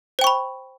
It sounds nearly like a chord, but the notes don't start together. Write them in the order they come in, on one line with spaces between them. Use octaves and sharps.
C5 G5 C#6 B5